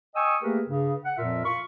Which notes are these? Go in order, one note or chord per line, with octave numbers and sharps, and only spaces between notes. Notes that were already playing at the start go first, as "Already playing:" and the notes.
D#5 G5 G#5 C#6 D#6 E6
A3 A#3 G4 G#4 A#4 B4
G2 C#3
F#5
F2 A#2 F3 F4 A#4 E5
F4 B5 C#6